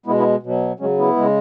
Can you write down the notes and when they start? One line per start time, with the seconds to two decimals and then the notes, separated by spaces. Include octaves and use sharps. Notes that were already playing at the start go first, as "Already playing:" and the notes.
0.06 B2 G#3 B3 E4
0.19 B3 E4
0.43 B2 F#3
0.79 C#3 F#3 G#3 C#4
0.98 B3 E4
1.16 C#3 G#3